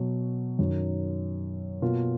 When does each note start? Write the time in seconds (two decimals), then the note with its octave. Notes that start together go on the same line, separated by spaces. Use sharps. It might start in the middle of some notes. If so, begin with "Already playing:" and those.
Already playing: B2 F#3
0.59 F#2 D#3 F#3
1.82 B2 A#3 F4